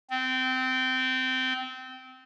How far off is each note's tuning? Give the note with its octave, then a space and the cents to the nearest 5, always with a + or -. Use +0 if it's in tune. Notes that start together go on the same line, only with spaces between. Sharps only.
C4 -20